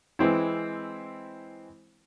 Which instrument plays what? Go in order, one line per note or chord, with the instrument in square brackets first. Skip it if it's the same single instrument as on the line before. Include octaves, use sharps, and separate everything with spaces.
[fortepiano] E3 G#3 C4 E4